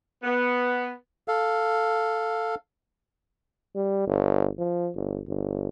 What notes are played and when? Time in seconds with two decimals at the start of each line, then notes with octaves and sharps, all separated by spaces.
0.23 B3
1.28 A4 F5
3.75 G3
4.07 G1
4.59 F3
4.95 G1
5.28 G1